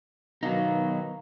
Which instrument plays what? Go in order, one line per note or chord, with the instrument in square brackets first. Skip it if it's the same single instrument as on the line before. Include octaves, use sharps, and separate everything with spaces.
[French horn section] B2 D#3 [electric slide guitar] F#3 B3 D#4 [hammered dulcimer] F5 A#5